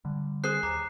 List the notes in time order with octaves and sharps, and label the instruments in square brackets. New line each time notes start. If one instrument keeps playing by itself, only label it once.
[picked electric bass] D3 G3
[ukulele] G#4 C5 [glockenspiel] F#6 C7
[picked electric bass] D#2 [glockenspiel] A#5 D6